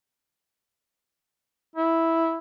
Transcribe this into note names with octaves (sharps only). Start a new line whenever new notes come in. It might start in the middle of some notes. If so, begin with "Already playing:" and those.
E4